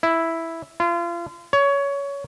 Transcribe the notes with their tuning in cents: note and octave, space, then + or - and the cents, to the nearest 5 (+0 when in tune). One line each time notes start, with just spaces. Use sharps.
E4 +0
F4 -35
C#5 +20